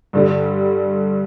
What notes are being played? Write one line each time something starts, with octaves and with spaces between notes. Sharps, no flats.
G2 D3 G3